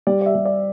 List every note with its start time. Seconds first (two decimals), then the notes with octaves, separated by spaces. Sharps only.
0.07 G3 D5
0.21 D5
0.26 E5
0.35 G3
0.45 D5